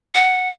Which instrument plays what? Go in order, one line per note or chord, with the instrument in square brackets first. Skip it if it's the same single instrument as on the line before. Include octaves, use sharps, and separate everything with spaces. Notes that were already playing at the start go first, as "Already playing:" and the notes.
[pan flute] F#5